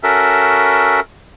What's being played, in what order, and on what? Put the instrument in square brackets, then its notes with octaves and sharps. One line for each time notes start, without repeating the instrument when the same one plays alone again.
[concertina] C#4 F#4 A4 A#4 E5